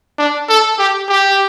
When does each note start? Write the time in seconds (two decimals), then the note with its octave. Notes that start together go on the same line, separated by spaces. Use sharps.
0.19 D4
0.49 A4
0.79 G4
1.09 G4